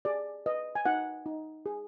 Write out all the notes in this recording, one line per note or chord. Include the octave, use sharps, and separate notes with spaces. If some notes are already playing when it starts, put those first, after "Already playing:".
G#4 D5
B4 D#5
G#5
D#4 F#5
D#4
G#4